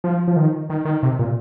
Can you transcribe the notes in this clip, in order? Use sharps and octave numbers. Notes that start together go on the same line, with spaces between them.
F3
F3
D#3
D#3
D#3
C3
A#2